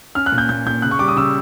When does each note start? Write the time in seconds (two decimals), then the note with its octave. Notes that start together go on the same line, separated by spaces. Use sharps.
0.15 C#4 F6
0.26 F#6
0.32 A#2
0.38 G6
0.49 A#2 G6
0.66 A#2 G6
0.82 C#3 F#6
0.91 C#6
0.99 G3 D6
1.08 D#6
1.16 C#3 E6